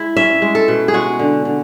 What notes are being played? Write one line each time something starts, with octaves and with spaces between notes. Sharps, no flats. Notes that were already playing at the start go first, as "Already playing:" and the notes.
Already playing: G#3 E4
C#4 E5
G#3
A4
B2
G#4
G#3 F#4
D3
D3